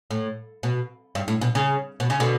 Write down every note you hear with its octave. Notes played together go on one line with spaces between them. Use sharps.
A2
B2
G2
A2
B2
C#3
B2
C#3
B2 D3